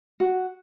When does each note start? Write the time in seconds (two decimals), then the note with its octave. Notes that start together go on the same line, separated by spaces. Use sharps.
0.20 F#4